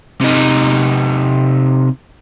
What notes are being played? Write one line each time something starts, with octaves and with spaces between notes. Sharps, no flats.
C3 D#4